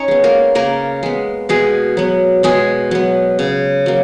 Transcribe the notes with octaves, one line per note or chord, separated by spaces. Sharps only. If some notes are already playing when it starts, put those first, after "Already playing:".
Already playing: C#4 D#4 C#5 D#5
G#3 B3
A#3 A#4
C#3 A#3 A#4
G#3 B3
B2 G#3 G#4
F#3 B3
B2 G#3 G#4
F#3 B3
C#3
F#3 A#3